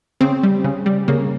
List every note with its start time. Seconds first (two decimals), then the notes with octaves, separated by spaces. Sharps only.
0.21 C#3 C4
0.43 G3
0.64 C#3
0.86 G3
1.08 C#3 A#3